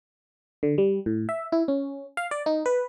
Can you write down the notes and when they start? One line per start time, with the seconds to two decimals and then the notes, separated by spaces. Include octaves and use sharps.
0.63 D3
0.78 G3
1.06 A2
1.29 E5
1.52 E4
1.68 C#4
2.17 F5
2.31 D5
2.46 D#4
2.66 B4